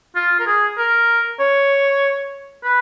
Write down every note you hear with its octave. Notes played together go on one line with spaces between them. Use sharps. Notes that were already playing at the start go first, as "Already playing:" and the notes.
F4
A#4
G#4
A#4
C#5
B4